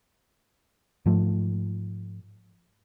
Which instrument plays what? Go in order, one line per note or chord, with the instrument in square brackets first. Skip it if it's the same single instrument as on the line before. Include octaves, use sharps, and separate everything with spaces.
[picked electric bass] G#2 F3 A3